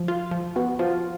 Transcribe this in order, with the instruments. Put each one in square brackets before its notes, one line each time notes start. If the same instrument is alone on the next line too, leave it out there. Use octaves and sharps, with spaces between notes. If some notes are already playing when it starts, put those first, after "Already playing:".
Already playing: [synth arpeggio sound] F3
F4
F3
[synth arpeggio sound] B3 [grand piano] F#4
[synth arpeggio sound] F3 [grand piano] F4